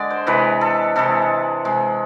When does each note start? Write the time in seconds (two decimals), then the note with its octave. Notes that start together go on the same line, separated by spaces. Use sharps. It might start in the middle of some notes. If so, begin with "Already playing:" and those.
Already playing: D3 G#3 D5
0.10 C5
0.27 C3 E3 G#3 B4
0.61 A4
0.96 C3 E3 G#3 A4
1.65 C3 G#3